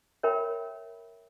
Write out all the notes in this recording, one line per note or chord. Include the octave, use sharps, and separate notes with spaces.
A#4 C#5 E5 G5 B5